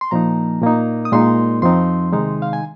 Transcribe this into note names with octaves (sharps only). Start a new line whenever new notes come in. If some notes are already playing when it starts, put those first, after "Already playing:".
C6
A#2 F3 A#3 D#4 A#5
A#2 A#3 D#4
D#6
A#2 G#3 D#4 C6
F2 F3 C4 D#4 C6
C3 D#3 G#3 D#4
F5
G#5